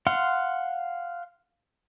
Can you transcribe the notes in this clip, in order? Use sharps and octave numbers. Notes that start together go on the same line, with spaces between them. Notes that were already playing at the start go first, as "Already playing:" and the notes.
F5 F#5 C6